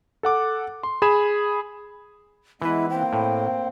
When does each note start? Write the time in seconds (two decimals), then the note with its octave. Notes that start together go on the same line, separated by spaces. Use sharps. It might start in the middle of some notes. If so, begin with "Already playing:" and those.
0.23 A4 F#5 D6
0.83 C6
1.02 G#4 B5 G#6 E7
2.61 E3 G#3 B3 E4 B4
2.90 A#3 C4 C5 G5
3.13 A2